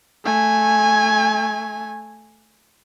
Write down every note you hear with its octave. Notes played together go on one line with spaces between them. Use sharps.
A3 G#5